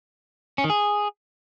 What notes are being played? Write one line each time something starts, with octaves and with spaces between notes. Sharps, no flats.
C#4
D#3
G#4